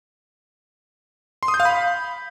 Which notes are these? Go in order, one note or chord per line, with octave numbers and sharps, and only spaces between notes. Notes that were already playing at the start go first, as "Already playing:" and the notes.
C6
D#6
G6
F5
B5